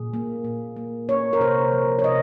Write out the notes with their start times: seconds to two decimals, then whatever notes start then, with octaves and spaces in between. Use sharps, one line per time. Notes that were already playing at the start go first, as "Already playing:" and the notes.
Already playing: A#2 G#4
0.13 A#3
0.44 A#2
0.76 A#3
1.09 A#3 C#5
1.33 A#4
1.40 C3 C5
1.73 F3
1.99 C#5
2.04 C3 D#5